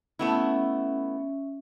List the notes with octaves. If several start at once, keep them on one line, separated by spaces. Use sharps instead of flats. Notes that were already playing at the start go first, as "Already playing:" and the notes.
A3 B3 C#4 E4 E5